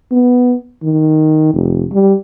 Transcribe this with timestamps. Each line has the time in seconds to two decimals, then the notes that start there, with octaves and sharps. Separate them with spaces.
0.12 B3
0.83 D#3
1.54 F1
1.92 G3